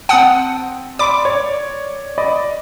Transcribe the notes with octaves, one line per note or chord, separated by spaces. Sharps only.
C4 F#5 G5 A5 D#6
D5 B5 C6 D6
C#5 D5
D5 D#5 B5